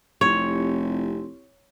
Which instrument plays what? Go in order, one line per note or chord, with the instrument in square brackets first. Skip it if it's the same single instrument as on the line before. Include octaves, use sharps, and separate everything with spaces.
[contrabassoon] F1 [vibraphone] C4 E4 G4 [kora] C#5